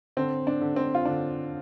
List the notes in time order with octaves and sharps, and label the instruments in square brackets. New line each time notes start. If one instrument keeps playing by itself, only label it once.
[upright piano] D3 C4
D4
D3
C4
F4
D3 D4